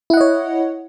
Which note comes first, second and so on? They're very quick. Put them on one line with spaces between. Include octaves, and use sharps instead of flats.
E4 F#5 D#5 C#5